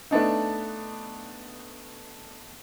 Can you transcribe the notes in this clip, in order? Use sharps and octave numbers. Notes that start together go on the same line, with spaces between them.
A3 B3 D4 D#4